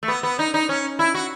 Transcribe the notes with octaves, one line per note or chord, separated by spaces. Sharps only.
A3
B3
B3
D#4
D#4
C#4
E4
F#4